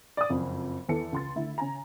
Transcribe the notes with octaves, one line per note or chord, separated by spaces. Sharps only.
D5 D#6
F#1 F2
E2 E3 A4 C#7
C#2 C6 A6
D3 A3 E4
C#3 G#5 A#5